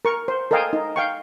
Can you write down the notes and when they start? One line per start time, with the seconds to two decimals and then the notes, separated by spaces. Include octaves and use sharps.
0.05 A#4 C#6
0.28 C5
0.51 A4 A#4 D#5 F5 G5 G#5
0.73 D#4
0.96 F5 G5 C#6